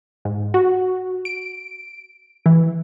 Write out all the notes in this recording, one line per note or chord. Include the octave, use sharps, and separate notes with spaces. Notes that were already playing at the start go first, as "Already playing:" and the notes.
G#2
F#4
D7
E3